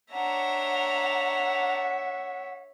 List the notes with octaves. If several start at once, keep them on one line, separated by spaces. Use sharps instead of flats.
D4 C#5 E5 F#5 A#5